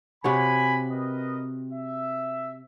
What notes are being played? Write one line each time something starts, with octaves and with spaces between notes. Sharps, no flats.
C3 F#4 C#5 G#5 B5
A#4 B4 D#5
E5